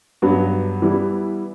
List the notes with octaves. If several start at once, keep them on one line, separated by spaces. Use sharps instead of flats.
G2 F#3 B3 F#4
E3 G3 B3 E4